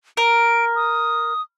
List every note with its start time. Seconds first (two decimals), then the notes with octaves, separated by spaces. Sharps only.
0.17 A#4 D7
0.76 D#6